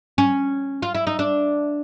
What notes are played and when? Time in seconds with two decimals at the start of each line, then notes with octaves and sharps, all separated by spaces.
0.18 C#4
0.82 F4
0.95 E4
1.07 D#4
1.19 D4